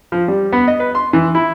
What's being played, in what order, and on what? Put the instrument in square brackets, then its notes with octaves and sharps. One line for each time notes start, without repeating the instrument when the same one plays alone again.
[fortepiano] F3
G3
B3
D#5
B4
C6
E3
E4